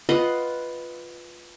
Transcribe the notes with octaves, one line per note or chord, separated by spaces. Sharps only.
F4 B4 D#5 F#5